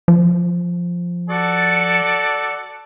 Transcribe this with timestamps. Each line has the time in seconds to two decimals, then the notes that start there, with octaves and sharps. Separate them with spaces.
0.08 F3
1.29 F#4 A4 D5